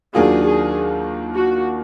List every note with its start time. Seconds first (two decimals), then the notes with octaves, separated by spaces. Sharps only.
0.15 D#2 D#3 F#3 D4 F4 G#4
0.45 G#4
1.35 F#4